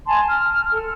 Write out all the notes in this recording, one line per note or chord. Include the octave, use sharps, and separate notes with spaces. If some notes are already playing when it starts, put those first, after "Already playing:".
G#5 A5 C6
F6
A4